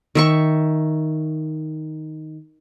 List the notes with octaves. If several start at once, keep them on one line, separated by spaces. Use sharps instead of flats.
D#3 E5 C#6